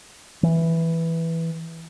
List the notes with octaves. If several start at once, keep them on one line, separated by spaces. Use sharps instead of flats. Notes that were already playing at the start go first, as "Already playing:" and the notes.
E3